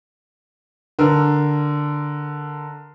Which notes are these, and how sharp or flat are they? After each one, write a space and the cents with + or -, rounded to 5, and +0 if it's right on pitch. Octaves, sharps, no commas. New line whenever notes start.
D3 +0 A#4 +0